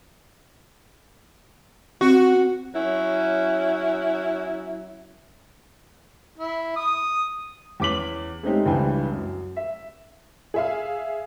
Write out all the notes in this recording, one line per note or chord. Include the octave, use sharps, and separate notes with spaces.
C4 F#4
F#3 C#4 E4
E4
D#6
E2 C#4 D6 B6 F#7
G#3 A3 C4 C#4 D#4 G4
C#2 G2 E3 D4 G5 G#5
F#2
E5
G#4 E5 F5